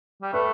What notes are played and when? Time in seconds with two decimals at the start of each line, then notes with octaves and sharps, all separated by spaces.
0.22 G3
0.33 A3 B4